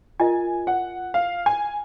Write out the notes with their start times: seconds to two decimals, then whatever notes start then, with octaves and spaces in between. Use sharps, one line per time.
0.20 F4 A#4 D#5 G#5
0.67 F#5
1.14 F5
1.46 G#5